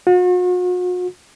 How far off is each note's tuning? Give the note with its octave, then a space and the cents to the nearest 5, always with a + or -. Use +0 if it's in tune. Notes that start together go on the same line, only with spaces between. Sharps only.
F#4 -45